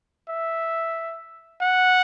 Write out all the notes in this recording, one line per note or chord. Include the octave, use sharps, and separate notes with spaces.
E5
F#5